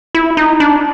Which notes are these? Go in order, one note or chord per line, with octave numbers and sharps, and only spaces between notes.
E4
D#4
D4